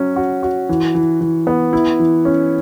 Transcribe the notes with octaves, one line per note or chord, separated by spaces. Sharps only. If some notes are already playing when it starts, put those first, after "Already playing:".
Already playing: F#3 C#4
F#4
F#4
E3
E3
E3
B3
E4
E3
C#4